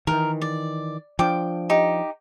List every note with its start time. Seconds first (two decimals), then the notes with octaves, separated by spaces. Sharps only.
0.07 D#3 E3 A#4
0.41 D5
1.19 F3 D4 G5 D6
1.70 D#4 G4